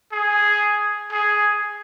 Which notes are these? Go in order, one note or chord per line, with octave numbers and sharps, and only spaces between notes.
G#4
G#4